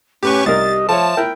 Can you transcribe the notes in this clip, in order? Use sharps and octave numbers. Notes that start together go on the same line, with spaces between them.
A2 C#4 G4 B4 C#6
C2 D#4 G4 A#4 D#5 A6
F3 A4 C#5 E5 A5
E4 A#4 G5